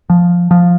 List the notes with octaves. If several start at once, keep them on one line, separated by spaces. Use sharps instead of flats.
F3
F3